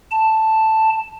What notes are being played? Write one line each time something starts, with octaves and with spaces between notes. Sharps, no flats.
A5